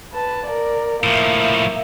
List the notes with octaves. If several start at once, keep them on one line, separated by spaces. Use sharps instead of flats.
B4 A5
A#4 D5
A2 F3 A#3 E5